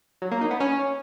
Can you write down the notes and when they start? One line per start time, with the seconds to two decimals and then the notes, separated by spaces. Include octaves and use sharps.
0.22 F#3
0.31 A#3
0.41 D#4
0.51 B3
0.60 C#4